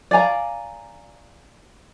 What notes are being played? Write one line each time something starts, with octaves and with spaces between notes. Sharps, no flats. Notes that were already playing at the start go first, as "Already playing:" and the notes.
D5 F5 G#5 A#5